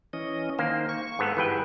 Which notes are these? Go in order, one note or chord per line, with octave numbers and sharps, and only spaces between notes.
E3 C#4 D#5
D#3 A#3 C5
C#6
G#2 B3 A4
G1 E3 G#4 B4 G5